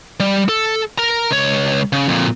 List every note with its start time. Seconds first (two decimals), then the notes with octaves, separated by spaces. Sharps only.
0.20 G3
0.49 A4
0.98 A#4 A#5
1.31 C#2 C#5
1.93 C#3
2.09 F2 A#2